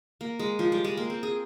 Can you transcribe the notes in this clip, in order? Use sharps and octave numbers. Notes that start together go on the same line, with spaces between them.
A#3
G#3
F3
G3
G#3
A#3
C4
G#4